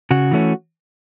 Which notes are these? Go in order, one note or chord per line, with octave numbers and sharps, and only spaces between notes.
C#3 F#4
E3 A3 C#4